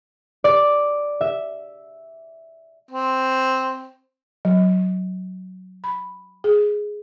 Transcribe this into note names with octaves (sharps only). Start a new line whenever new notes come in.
D5
E5
C4
F#3
B5
G#4